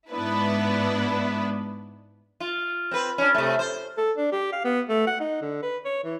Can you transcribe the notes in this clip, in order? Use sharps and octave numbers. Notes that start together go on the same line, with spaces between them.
G#2 B3 D4 E4 B4
F4
C4 B4
C#4 D4
C3 A3
C5
A4
D4
G4
F5
B3
A3
F#5
D#4
D3
B4
C#5
E3